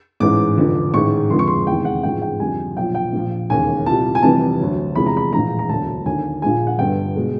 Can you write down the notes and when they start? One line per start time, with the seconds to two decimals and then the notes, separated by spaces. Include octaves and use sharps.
0.20 A1 G#2 E3 G#3 D6
0.57 F1 F2 D3 F3
0.94 A1 G#2 D#3 G#3 C#6
1.30 F1 F2 D3 F3 G#3 C6
1.39 C#6
1.47 C6
1.67 E2 C3 D#3 G#3 G5
1.85 F#5
2.03 A1 G#2 F3 G#3 G5
2.22 G5
2.40 F2 D3 G3 G#5
2.76 B1 A#2 F3 G5
2.95 G5
3.13 A#1 A#2 F3
3.50 E1 D#2 C#3 G#5
3.86 C2 A#2 G3 A5
4.15 G#5
4.23 F1 F2 C3 E3 G3 A5
4.60 D2 D3 F#3
4.95 E2 C3 F3 G#3 B5
5.06 A#5
5.17 B5
5.32 A#1 A2 E3 G#3 A#5
5.59 A#5
5.69 E1 D2 D3 F#3 A5
6.06 D#2 D3 F#3 G#5
6.42 A#1 A#2 F3 G#3 G#5
6.67 F#5
6.79 G1 G2 D3 G5
7.16 B2 G#3